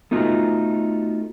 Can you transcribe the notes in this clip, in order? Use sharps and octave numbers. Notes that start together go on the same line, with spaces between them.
A3 B3 D#4 F4 F#4